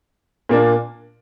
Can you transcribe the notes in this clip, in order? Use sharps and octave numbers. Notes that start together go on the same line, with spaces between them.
A#2 A#3 D4